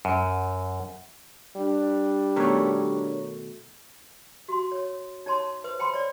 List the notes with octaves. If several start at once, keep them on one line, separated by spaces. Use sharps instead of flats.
F#2
G3 D4
B2 D#3 A3 A#4 C#5
F#4 C6
C#5
D#4 C#5 A5 C6
B4 C5 D#6
C5 G5 A5 B5 C6
C#5 D5